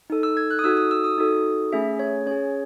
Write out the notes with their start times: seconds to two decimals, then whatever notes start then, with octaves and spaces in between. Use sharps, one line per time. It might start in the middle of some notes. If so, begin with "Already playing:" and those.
0.10 D#4 A4
0.23 E6
0.37 G#6
0.51 F#6
0.59 D#6
0.64 D#4 F#4 A4 E6
0.77 D#6
0.91 E6
1.04 D#6
1.18 D#4 F#4 A4
1.72 A3 C#4 G#4 E5
1.99 C#5
2.26 C#4 G#4 C#5